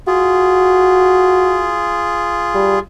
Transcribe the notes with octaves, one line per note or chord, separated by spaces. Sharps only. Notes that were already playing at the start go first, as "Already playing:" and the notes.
F4 F#4 G#4
G3